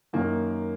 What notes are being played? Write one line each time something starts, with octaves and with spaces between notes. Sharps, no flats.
F#2 D#3 A#3